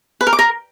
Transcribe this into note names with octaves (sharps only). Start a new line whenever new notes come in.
B4
A#4
D6
A#4